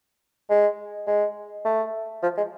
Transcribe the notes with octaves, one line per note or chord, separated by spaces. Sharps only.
G#3
G#3
A3
F3
G#3